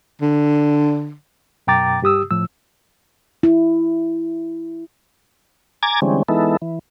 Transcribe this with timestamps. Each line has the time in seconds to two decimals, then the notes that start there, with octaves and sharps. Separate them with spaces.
0.22 D3
1.67 F#2 B2 G5 A#5 D6 A6
2.02 G2 G4 D#6 E6
2.31 A2 F3 E6
3.43 E4
5.83 G#5 A#5 D6 G#6 A6
6.02 D3 E3 G3 G#3 C4 C#4
6.28 E3 G#3 B3 D#4 E4 A4
6.62 E3